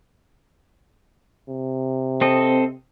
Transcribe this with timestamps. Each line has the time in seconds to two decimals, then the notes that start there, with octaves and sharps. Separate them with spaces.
1.49 C3
2.21 C4 A4 D#5